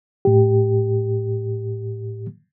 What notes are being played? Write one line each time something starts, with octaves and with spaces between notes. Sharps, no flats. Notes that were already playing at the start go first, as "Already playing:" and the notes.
A2 G4